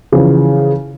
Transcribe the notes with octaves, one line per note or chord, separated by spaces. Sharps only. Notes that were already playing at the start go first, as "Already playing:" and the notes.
C#3 E3 F3